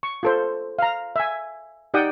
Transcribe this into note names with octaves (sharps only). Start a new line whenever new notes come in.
C#6
F4 A4 C5
F5 A#5
E5 G#5
D#4 G4 D5 F#5 G5 D#6